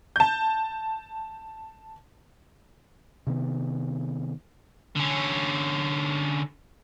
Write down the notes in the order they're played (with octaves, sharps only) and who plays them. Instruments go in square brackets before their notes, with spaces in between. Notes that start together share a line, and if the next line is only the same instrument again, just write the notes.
[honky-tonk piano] A5 G6
[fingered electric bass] C3 D#3 B3
[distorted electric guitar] D3 C#4